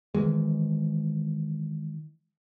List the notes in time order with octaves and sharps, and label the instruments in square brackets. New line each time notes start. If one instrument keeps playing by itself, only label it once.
[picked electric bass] D#3 E3 G#3